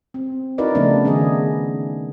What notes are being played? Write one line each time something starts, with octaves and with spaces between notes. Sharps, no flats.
C4
D#4 E4 F#4 A#4 B4 D5
C#3 F3 A3 B3 D4 D#4
D#3 B3 G#4 D#5